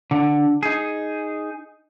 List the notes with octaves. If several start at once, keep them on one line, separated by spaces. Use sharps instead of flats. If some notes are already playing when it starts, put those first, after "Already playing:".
D3
D#4 G#4